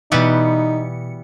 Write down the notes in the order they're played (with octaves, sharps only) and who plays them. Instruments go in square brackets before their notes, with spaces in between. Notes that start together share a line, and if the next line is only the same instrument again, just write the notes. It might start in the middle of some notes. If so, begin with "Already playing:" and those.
[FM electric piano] B2 C#7 [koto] E3 G3 B3 [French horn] D#4